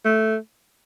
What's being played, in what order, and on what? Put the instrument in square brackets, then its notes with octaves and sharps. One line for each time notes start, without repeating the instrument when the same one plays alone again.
[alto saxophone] A3